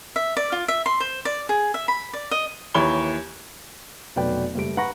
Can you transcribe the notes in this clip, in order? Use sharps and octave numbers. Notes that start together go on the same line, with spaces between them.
E5
D5
F4
E5
C6
C5
D5
G#4
E5
B5
D5
D#5
D#2 E3 C#5 B5 G7
F1 B2 F#3 B4 D5 G5
F#1 G3 A3 D7
B4 F#5 A#5 B5 C#6 A#6